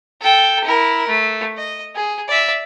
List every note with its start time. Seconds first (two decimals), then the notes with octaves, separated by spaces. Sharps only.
0.21 A4 G5
0.64 E4 A#4
1.08 A3
1.57 D#5
1.95 G#4
2.28 D5 E5